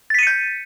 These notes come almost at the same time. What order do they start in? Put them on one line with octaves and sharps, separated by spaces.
A6 B6 D#7 C#7 G6